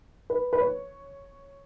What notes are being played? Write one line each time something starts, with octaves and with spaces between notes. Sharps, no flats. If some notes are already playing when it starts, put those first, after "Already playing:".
B4
B4
C#5